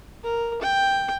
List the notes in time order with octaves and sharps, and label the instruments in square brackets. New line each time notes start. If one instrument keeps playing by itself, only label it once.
[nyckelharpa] A#4
G5